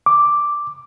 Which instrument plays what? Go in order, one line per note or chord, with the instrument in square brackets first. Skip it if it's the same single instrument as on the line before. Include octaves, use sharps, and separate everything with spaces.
[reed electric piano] D6